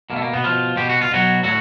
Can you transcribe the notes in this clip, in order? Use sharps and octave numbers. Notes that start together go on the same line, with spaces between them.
B2 A#3
A3
A#3
B2 B3
B2 F3 F4
B2 G4
F#4
F4
B2 F#3 F#4
A2 F#3 F#4